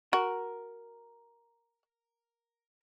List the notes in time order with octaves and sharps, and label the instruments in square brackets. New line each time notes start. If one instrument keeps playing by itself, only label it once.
[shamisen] F#4 [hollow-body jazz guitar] A#4